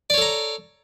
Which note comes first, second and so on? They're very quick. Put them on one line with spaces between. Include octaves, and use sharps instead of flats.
D5 C#5 A4 A#5